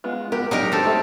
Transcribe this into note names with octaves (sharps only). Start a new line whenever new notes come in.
G#3 B3 F4
B3 F#4 G4 A#4
F#3 G#3 D4 D#4 G4 A#4
C4 A4
A3 G4 E5